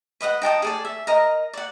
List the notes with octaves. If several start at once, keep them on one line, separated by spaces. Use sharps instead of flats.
B4 D#5 F5 F#5
D#4 G5 A5 D#6
G#4 A4 D5
E5
A#4 D#5 A#5
D5 F#5